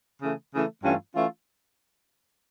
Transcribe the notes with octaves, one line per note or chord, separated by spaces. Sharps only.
C#3 E3 A3
C#3 E3 A3
G2 E3 A3 C#4 F4
E3 A3 C#4 F4